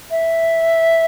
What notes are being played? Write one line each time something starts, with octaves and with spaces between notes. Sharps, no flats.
E5